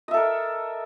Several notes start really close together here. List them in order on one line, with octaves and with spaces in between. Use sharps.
D#5 E5 A4 A#4